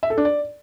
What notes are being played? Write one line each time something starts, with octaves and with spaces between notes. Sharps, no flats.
E5
A4
D4
D5